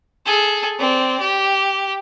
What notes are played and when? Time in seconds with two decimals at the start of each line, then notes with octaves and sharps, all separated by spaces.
0.26 G#4 A4
0.79 C4 D5
1.21 G4